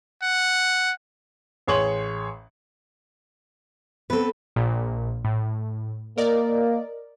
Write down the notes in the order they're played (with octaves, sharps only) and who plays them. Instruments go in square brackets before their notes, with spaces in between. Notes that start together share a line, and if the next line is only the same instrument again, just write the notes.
[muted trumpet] F#5
[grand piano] A1 G#4 C#5 C6 C#6 F#7
[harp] B3 C4 [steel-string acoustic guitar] A4 B4
[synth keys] A#1 A#2
A2
[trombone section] A#3 [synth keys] A#4 D5 D#5